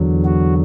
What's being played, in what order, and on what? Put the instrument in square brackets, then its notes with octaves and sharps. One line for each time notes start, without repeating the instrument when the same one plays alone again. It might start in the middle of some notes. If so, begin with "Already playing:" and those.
Already playing: [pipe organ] E2 D3 F#3
F#4